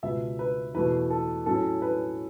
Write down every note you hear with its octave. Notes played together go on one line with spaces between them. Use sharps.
C#2 B2 B3 E5
B4
E2 B2 A3 B4
A4
A2 F#3 C#4 A4
B4